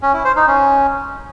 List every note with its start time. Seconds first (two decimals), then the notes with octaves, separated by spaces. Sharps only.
0.02 C#4
0.14 E4
0.25 C5
0.36 D#4
0.47 C#4